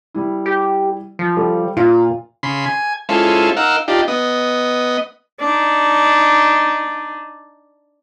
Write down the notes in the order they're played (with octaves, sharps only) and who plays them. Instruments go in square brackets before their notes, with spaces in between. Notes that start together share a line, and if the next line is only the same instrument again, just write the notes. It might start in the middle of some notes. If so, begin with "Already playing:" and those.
[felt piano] G3 E4
[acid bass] G4
F3
[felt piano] G3 G4 A4
[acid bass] A#2 [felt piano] F4
[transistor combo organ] C#3 B5 C6
G#5
G#3 C#4 E4 F4 A4 C5
D#4 A#4 F5 F#5 E6
D4 D#4 F4 G4
B3 D#5
[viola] D4 D#4